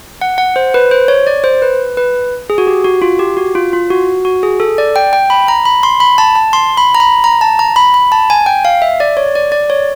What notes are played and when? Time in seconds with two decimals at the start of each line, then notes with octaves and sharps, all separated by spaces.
0.21 F#5
0.38 F#5
0.56 C5
0.74 B4
0.91 C5
1.08 C#5
1.27 D5
1.44 C5
1.62 B4
1.97 B4
2.50 G#4
2.58 F#4
2.67 G4
2.85 F#4
3.02 F4
3.19 G4
3.37 F#4
3.55 F4
3.73 F4
3.90 F#4
4.25 F#4
4.43 G#4
4.60 A4
4.78 D5
4.96 G5
5.13 G5
5.30 B5
5.48 A#5
5.65 B5
5.83 C6
6.00 B5
6.18 A5
6.35 A5
6.53 C6
6.77 B5
6.95 A#5
7.00 B5
7.24 A#5
7.41 A5
7.59 A#5
7.76 B5
7.94 B5
8.12 A5
8.30 G#5
8.46 G5
8.65 F5
8.82 E5
9.00 D5
9.17 C#5
9.35 D5
9.52 D5
9.70 C#5